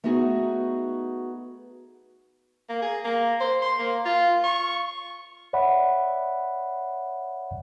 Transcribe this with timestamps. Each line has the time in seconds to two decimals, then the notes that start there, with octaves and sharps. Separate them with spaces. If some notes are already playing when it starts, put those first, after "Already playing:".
0.04 A3 B3 D#4 F#4 G#4
2.69 A#3
2.82 G#4
3.04 A#3
3.40 C5
3.62 C6
3.79 A#3
4.05 F4
4.44 C#6
5.53 C#5 D5 E5 F#5 B5